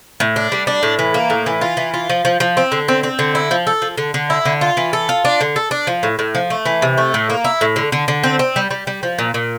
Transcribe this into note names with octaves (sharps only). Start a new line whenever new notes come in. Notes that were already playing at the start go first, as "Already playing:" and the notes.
A2
D4
G3
D4
A2
E3
A#3
A2
E3
F4
E3
F4
F3
F3
F3
C4
D3
C4
C4
D3
E4
F3
A4
F3
D3
D3
E4
D3
F4
E3
A4
F4
D4
D3
A4
D4
F3
A2
A2
F3
A3
E3
C3
A3
A2
A#3
E4
A2
D3
D3
D3
C4
C4
G3
G3
G3
F3
A#2
A#2